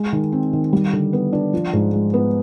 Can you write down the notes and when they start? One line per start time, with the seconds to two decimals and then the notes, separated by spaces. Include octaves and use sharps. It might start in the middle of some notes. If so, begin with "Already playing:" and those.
Already playing: G#3
0.13 D#3
0.32 C4
0.53 D#3
0.73 G3
0.93 D3
1.13 B3
1.33 D4
1.53 F3
1.73 G#2
1.93 G#3
2.14 B3